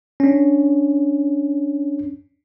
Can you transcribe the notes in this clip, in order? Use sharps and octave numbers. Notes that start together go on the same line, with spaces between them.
C#4 D4